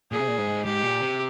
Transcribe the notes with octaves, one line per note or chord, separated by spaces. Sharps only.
A#2 G#4
C3
A#2
G#2
G#2 G4
A#2
C3